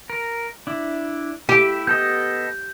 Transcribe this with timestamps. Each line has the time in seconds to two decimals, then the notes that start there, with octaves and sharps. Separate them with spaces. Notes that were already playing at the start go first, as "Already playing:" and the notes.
0.10 A#4
0.67 D4 E4
1.49 E4 G4 E5
1.87 B3 A4 D#5 G6